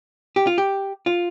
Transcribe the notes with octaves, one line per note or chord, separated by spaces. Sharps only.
G4
F4
G4
F4